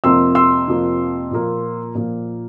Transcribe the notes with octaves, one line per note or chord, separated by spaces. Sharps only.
F2 C3 F3 A#3 C6 E6
C6 E6
F2 C3 F3 A#3
A#2 F3 A#3
A#2 F3 A#3